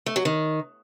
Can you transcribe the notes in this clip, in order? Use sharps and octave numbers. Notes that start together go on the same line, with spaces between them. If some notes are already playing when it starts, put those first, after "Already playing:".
A3
F#3
D#3